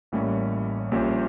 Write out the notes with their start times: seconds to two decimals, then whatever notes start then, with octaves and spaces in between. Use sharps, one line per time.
0.12 A1 A2 G3 A#3 C#4
0.92 A#1 A#2 G3 C#4 G4